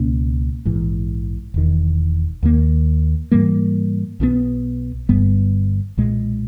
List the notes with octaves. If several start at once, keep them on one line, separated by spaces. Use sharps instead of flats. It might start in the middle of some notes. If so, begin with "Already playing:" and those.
Already playing: C#2 B2 A#3 C#4
A#1 G#2 E3
E1 E2 D#3
D#2 D#3 A#3
G#2 E3 G3 A#3
B1 B2 G3 B3
G1 G2 G3 B3
B1 A#2 G#3